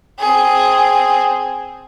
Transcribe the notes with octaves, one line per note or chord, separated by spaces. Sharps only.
C4 G#4